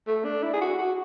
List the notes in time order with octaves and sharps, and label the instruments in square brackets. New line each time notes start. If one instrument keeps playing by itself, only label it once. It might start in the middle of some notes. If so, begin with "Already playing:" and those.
[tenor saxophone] A3
D4
E4
G#4
F#4
F#4